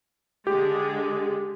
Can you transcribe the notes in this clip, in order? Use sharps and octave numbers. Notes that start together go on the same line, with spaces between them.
D3 G#3 G4 G#4